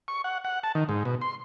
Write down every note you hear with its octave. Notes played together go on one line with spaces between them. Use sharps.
C#6
F#5
F#5
A5
D#3
G#2
B2
C6